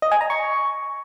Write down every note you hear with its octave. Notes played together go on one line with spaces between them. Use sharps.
D#5
G#5
A#5
C#6